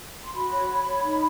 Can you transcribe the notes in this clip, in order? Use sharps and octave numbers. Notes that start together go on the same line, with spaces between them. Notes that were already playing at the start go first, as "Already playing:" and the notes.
C6
F#4 B5
C#5
C#5
C#5
D#4